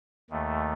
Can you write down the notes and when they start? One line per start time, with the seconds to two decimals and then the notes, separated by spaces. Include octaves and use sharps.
0.30 D#2 D#3 A3